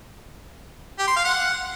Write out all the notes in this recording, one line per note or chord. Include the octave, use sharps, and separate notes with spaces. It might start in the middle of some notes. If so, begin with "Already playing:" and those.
G4
C6
F5
F#5